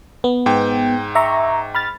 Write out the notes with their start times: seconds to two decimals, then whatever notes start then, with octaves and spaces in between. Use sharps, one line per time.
0.24 B3
0.46 G#2 G5
1.15 E5 A#5 C#6
1.75 B5 F6 A6